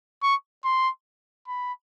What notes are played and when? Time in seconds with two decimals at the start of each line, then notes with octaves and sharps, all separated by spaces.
0.23 C#6
0.64 C6
1.48 B5